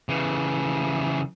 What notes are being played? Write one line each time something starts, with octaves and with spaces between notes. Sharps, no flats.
C#3 E3